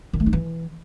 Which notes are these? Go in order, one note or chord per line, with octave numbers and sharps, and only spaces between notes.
D#3
A3
D#4
E3